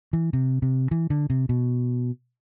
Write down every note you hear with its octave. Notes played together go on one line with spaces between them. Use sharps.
E3
C3
C3
E3
D3
C3
B2